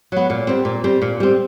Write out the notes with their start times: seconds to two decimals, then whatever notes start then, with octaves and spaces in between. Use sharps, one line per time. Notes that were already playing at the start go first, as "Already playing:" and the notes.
0.12 F#3 B3
0.30 A#2
0.47 G3 C4
0.65 A#2
0.84 G3 C4
1.02 A#2
1.20 G3 C4